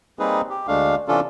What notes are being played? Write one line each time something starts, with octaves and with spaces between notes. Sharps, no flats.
G3 A#3 C4 D#4 G#4 B4
G4
D2 G#3 A3 D4 F5
C3 E3 C#4 D4 F4 A4